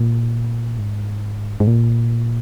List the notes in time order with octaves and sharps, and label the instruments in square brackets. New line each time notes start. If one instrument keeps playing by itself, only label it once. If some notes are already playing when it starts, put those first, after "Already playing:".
Already playing: [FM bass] A#2
G#2
G#2
A#2